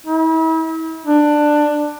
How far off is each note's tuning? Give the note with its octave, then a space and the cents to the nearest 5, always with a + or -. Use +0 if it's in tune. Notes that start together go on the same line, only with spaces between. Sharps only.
E4 -40
D4 +15